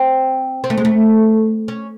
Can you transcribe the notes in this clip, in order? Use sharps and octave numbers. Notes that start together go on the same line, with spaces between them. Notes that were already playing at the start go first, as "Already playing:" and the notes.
Already playing: C4
C4
A3
G#3
A3
C#4